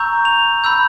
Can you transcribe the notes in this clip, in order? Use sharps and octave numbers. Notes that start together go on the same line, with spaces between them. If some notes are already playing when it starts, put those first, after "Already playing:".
Already playing: A#5 C#6 E6 G6
F7
B5 E6 G6